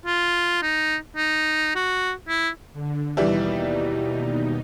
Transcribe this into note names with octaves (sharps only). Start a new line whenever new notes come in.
F4
D#4
D#4
F#4
E4
D3
D#2 B2 E3 G3 D#4 E4